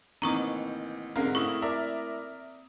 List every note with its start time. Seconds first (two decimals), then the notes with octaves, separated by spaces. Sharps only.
0.22 A1 D#3 E3 A#3 C4 A#5 C#6 D#6
1.16 G#2 D3 G#3 C4 A#4 F5
1.35 A3 E4 C#6 D#6
1.62 A#4 D5 E5